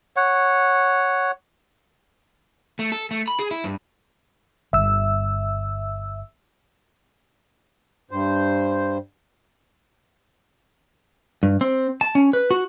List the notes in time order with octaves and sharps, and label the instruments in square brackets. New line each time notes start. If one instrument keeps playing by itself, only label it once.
[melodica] C#5 F#5
[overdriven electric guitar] A3
A4
A3
B5
G#4
E4
G2
[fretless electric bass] G1 [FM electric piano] E5 E6
[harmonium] G2 C5
[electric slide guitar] G2
C4
A5
C#4
B4
F#4